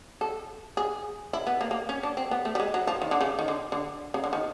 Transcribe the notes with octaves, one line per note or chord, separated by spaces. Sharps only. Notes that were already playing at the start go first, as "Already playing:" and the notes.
A4
G#4
E4
B3
A#3
A#3
C#4
D4
C4
B3
A3
G3
G#3
F#3
F3
D#3
D3
C#3
D#3
D3
D3
C#3
D3
D#3